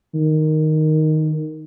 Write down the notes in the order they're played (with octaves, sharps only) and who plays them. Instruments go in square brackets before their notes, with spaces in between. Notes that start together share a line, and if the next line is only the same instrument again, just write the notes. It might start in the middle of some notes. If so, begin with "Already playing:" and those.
[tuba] D#3